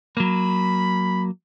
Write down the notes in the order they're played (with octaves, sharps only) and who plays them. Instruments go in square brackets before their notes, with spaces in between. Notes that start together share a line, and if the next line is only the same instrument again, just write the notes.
[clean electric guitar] F#3 A#3 [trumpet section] B5